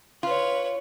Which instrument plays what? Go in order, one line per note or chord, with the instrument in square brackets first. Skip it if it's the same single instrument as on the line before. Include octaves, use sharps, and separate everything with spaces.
[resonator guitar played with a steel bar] F4 [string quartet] B4 C#5